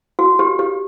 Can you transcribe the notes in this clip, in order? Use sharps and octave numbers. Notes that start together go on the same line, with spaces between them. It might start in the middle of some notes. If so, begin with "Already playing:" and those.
F#4
G4
G4